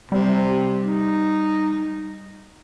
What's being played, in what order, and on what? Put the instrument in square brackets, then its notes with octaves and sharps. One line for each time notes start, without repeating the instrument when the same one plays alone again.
[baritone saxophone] C3 [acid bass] G3
[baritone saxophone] D#4